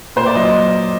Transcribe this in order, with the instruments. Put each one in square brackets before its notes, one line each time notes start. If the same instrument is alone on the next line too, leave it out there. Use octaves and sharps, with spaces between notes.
[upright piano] A#2 C5
D5
F#3 D#5